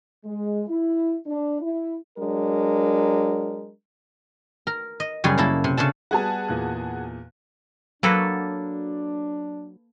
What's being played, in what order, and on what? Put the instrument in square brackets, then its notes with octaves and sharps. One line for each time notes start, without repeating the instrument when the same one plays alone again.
[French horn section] G#3
E4
D4
E4
F#3 G#3 D4 A#4
[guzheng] A#4
D#5
F#2 C#3 G3 G#4
A#3 E4 A4
C3
C#3 D4 A4 A5
[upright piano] G3 B3 [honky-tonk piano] F#4 G#4 A5
[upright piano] E2 A#2 F#6
[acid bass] F#3 [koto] A#3 A4 B4 [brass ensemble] D4